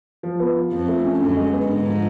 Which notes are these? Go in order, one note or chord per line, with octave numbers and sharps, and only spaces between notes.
F3
B3
F4
F2 F3
A3
C#4
F#2 D3
G#3
B3
G#2 D3
F3